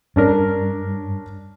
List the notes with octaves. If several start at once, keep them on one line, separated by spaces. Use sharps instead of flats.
G2 C#4 D4 A#4